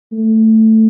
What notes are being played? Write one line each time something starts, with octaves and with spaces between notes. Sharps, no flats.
A3